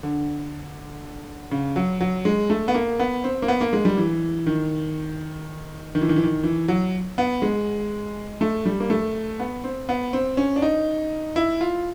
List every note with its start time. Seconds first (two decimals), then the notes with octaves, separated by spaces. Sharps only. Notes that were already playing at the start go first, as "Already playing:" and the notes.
0.03 D3
1.51 C#3
1.76 F#3
2.01 F#3
2.25 G#3
2.50 A3
2.68 B3
2.74 A#3
3.00 B3
3.24 C4
3.42 A#3
3.48 B3
3.61 A#3
3.73 G#3
3.85 G3
3.97 E3
4.46 D#3
5.95 D#3
6.02 E3
6.09 D#3
6.16 E3
6.24 D#3
6.44 E3
6.68 F#3
7.18 B3
7.42 G#3
8.41 A3
8.66 G3
8.80 A#3
8.90 A3
9.39 B3
9.64 C4
9.89 B3
10.13 C4
10.37 C#4
10.56 D4
10.62 D#4
11.36 E4
11.61 F4